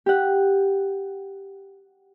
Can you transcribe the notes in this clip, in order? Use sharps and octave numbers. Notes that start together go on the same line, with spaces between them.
G4 F#5